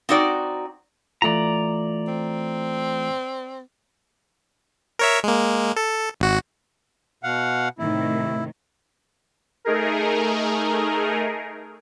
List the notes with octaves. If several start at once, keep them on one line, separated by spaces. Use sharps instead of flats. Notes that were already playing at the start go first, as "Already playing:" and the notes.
C4 D#4 F#4 D5
E3 A3 F4 D5 A#5
C4
A#4 C#5 E5
G#3 A#3
A4
G#1 F#4
B2 F5 F#5
A2 C3 D#3 E4
A3 D#4 G#4 A#4